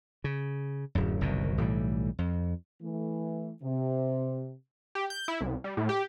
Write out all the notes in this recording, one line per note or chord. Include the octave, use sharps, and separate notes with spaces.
C#3
D1 F#2
F#1 C2 B2 D#3
B1 A2 E3 G3
F2
E3 A3
C3
G4
G6
E4
C2
G3
A2
G4